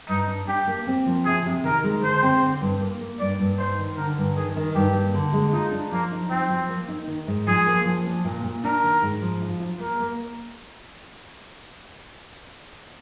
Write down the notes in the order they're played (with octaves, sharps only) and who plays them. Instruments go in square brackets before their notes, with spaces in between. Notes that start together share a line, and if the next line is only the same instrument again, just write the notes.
[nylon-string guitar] G2 [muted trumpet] D#4
[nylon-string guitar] D4
[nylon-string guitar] D4 [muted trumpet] G4
[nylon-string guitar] A#3
C4
F3
[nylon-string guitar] C3 [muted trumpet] G#4
[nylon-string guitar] C3
[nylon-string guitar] D#3 [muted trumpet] A#4
[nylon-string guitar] G#3
[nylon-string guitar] D3 [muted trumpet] C5
[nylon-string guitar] C4
D3
G2
A#3
A#3
[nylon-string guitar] G2 [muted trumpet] D5
[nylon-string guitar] G2
[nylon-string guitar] D#4 [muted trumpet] C5
[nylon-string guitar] D#3
[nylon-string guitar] D3 [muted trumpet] A#4
[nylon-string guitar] G2
[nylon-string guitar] D#3 [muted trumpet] G#4
[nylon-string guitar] D#3
[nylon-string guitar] G2 [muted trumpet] G4
[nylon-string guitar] A#3
D3
G#3
[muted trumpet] D#4 [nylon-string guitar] F4
[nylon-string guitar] D4
[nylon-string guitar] F3 [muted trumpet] A#3
[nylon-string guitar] D#4
[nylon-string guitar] F3 [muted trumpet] C4
[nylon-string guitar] F3
A#3
D#4
D#3
G#2
[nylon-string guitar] F3 [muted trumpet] G#4
[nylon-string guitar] A#3
F3
D4
A#2
A#2
[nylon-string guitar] D4 [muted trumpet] A#4
[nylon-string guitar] D#3
G#2
F3
F4
F4
[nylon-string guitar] A#3 [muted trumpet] A#4
[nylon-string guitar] A#3